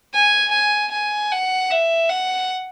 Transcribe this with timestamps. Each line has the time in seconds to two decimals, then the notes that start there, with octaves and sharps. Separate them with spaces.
0.14 G#5
0.52 G#5
0.92 G#5
1.31 F#5
1.70 E5
2.09 F#5